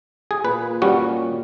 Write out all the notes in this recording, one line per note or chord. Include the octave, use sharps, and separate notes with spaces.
G#4
A#2 B4
G3 C#4 F#4